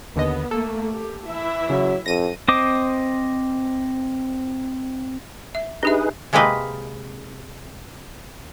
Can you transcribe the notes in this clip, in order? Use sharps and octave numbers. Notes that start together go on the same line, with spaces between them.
D#2 D3 B3 D#5
A3 A#3 A4
G4
E3 E4 E5
C#3 F#3
F2 A#6 D#7
C4 C5 D#5 D6 D#6
E5
D4 D#4 G4 G#4 B4 E5
C3 G#3 A#3 C4 B4 D#5